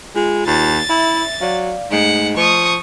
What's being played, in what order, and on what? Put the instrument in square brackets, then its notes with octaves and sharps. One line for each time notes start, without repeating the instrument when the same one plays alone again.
[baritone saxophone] G#3 [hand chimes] F4
[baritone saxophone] D#2 [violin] A6
[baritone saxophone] E4 [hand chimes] E5
[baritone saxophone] F#3 [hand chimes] D5 F5
[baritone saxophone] G#2 [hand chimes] A3 D#5 D7 [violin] F#5
[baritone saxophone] F3 [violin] C#6 D#6